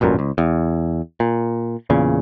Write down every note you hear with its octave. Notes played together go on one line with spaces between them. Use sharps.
E1 A1 F#2 A#2
C#2
E2
A#2
E2 A#2 C#3